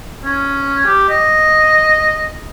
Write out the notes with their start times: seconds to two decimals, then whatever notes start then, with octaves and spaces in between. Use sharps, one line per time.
0.24 C#4
0.85 G4
1.09 D#5